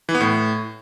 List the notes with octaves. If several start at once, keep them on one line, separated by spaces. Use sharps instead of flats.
E3
B3
A2